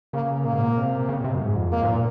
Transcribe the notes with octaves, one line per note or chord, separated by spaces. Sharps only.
C#3 A#3
A#2 A#3
G#2
A#2
C3
C#3
A#2
C3
F#2
G#2
F2
A#3
G#2
A#2